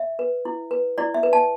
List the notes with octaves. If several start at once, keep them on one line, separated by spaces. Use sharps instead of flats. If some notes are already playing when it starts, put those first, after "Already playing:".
Already playing: E5
B4
E4
B4
E4 D5
E5
B4
A5